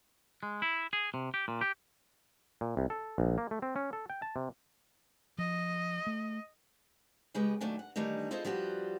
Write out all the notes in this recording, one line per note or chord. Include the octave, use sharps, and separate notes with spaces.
G#3
E4
G#4
C3
G4
A#2
G4
A#2
C2
A4
A#1
A#3
A3
C4
C#4
A4
G5
A5
C3
F3 D#5
A3
C#3 G#3 B3 G4 G#4 B4
D#2 F#3 A3 D4 G5 G#5
F#5
D#3 E3 G3 A3 D4 D#4
E4 F4 G#4 A4 C5 D#5
F3 G3 B3 F#4 G4